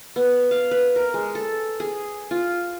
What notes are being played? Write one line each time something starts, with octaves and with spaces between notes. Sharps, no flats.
B3
F5
B4
A#4
G#3
A4
G#4
F4